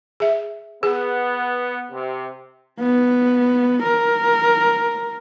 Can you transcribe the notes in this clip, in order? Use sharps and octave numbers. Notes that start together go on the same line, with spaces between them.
G#4 E5
B3 G#4
C3
B3
A#4